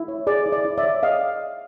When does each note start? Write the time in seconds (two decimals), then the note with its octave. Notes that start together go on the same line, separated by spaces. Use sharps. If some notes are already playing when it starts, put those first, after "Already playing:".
Already playing: E4
0.08 C#5
0.27 G#4 D5
0.46 E4
0.52 D5
0.65 E4
0.78 D5 E5
0.84 C#5
1.03 G#4 D#5 F5